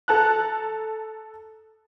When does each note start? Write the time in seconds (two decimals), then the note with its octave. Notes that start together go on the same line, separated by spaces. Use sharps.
0.08 A4 A5 A#5 F#6